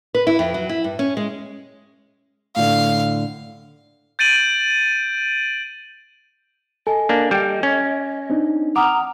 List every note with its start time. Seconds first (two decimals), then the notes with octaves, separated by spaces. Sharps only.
0.15 B4
0.27 E4
0.39 F2
0.54 F#3
0.69 E4
0.84 G2
0.99 C#4
1.17 G#3
2.56 A2 D3 F5
4.19 G6 A6 D7 D#7 F#7
6.87 A4 D#5 G#5
7.09 A#3 D4
7.31 G3 G5 D7
7.63 C#4 G#6
8.30 C4 D4 D#4
8.76 F#5 A#5 D6 D#6 F6